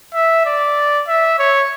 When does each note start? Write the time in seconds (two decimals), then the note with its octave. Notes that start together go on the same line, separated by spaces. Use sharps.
0.15 E5
0.46 D5
1.08 E5
1.39 C#5